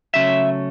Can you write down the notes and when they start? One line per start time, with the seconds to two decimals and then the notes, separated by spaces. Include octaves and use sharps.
0.14 C#3 F#3 A3 C#4 E5